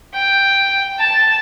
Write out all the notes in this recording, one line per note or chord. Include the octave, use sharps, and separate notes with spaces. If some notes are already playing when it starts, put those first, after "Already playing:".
G5
A5